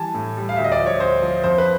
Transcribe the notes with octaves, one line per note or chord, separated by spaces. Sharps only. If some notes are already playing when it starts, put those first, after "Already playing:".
Already playing: E3 G3 G#5 A5
A2
G3
F5
D2 E5
D#5
D5
F3
C#5
D2 C5
F3
F2 C5
B4